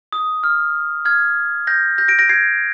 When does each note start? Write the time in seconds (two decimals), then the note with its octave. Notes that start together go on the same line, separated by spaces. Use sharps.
0.13 D#6
0.44 F6
1.05 F6 G#6
1.67 G6 A#6
1.98 G6 A#6
2.08 A#6 D7
2.19 A#6 D7
2.29 G#6 C7